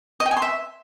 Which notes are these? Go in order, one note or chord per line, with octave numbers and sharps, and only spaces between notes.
D#5
G5
G#5
C6
E5